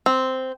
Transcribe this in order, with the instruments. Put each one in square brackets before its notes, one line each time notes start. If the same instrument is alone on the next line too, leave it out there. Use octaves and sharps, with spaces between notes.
[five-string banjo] C4